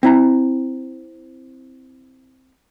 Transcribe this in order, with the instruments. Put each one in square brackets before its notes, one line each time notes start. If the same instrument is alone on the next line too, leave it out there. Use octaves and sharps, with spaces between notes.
[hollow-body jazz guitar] C4 E4 A#5